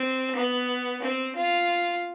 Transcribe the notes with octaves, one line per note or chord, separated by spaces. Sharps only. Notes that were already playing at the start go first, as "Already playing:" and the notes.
Already playing: C4
B3
C4
F4